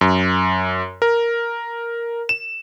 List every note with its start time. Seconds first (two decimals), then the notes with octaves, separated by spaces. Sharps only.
0.01 F#2
1.02 A#4
2.29 E7